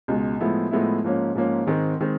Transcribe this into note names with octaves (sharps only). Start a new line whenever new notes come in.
C#2 B2 G#3
A2 F3 G#3 B3 E4
A2 F3 G#3 B3 E4
G#2 F3 A#3 C#4
G#2 F3 A#3 C#4
G#2 D#3 G#3 C4
D#3 G#3 C4